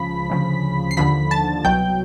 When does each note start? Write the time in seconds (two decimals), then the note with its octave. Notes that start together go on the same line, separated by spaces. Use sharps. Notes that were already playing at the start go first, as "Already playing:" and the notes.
Already playing: C#2 C#3 F3 B5 B6
0.30 D2 C#3 F3
0.91 C7
0.97 D#2 D3 F3 B5 B6
1.31 A5 A6
1.65 C2 B2 F#3 G5 G6